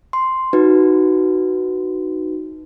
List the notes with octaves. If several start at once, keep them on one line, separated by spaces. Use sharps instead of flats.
C6
D#4 F#4 B4